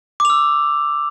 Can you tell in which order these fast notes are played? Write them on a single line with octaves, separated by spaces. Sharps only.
D6 F7 E6